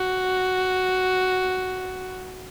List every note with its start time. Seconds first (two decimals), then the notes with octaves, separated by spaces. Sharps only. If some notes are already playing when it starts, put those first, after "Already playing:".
Already playing: F#4